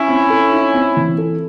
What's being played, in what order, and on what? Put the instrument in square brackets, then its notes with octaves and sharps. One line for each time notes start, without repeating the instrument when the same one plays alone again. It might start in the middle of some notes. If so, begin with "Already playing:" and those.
Already playing: [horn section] C#4 E4
[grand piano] C4
A4
D#4
C4
E3
A4